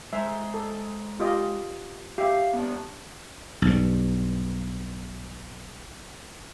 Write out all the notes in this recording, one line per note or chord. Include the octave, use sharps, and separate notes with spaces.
G#3 C5 E5
A4
F4 G4 D#5
G4 E5 F5
B3 D4
B1 G2